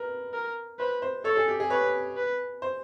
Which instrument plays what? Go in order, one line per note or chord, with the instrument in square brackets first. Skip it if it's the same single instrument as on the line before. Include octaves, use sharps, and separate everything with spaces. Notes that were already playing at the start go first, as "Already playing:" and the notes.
Already playing: [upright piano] A#4 B4
[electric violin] A#4
[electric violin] B4 [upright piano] C5
[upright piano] C5
[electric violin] A4 [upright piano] C#5
[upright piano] G#4
G4
G#4
[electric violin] B4 [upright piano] C#5
[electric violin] B4
[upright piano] C5